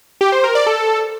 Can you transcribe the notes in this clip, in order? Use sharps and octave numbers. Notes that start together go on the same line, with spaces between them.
G4
C5
A#4
D5
A4